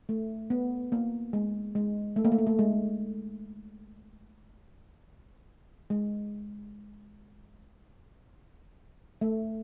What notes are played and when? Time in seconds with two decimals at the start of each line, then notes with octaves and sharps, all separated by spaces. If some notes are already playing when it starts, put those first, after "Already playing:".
0.09 A3
0.50 B3
0.92 A#3
1.33 G#3
1.75 G#3
2.16 A3
2.25 A#3
2.32 A3
2.38 A#3
2.47 A3
2.59 G#3
5.90 G#3
9.21 A3